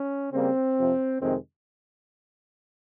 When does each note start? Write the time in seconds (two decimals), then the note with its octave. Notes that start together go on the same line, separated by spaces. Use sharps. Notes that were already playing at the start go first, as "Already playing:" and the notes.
Already playing: C#4
0.33 C#3 G3 A#3 C4
0.77 F2 C3 F3
1.21 F2 C3 D#3 G#3 C4